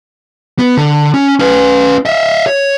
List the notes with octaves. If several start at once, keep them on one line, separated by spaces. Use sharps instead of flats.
B3
D3
C#4
C#4 B4
D#5 E5
C#5